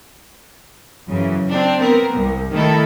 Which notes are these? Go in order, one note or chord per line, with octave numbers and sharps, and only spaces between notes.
F#2 C#3 E3
C4 D4
B3 C4 A#4
C2
D#3 A3 E4 A4